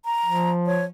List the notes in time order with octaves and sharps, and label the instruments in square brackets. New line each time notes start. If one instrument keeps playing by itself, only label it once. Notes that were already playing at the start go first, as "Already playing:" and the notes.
[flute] A#5
[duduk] F3
[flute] C#5